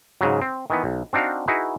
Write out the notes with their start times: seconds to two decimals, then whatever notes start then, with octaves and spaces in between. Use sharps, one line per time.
0.21 G#2 C#3 F#3
0.42 C4
0.70 D#3 E3 B3
0.84 B1
1.13 C4 D4 D#4 F#4 F5
1.48 D#4 E4 F#4 G#4 B4